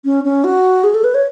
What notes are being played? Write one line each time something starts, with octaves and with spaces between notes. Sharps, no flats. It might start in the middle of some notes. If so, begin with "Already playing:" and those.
C#4
C#4
F#4
G#4
A4
B4
C#5